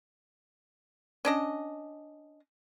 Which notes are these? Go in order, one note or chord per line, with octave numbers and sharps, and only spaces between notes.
C#4 D4 D#5